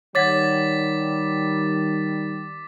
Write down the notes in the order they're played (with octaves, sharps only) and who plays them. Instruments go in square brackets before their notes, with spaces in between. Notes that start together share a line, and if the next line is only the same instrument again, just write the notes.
[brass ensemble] D#3 G3 [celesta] C#5 F#5 G#6 [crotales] D6 A6 B6